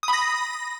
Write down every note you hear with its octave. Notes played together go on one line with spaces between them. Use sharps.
D#6
B5
A#6